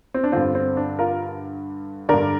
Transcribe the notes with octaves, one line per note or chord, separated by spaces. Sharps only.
C4
D4
G2 D3 C4 F4
C4
D4
F4 A#4
G2 D3 A#4 D5